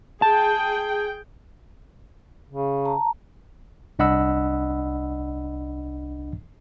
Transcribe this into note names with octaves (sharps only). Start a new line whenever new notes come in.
G#4 G5 A5
C#3
A5 A#5
C2 D4 D#5 F#5 B5 E6